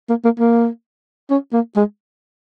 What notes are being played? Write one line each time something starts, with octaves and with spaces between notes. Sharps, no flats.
A#3
A#3
A#3
C#4
A#3
G#3